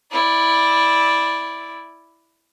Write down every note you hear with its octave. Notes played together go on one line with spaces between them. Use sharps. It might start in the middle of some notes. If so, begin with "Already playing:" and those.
E4 D5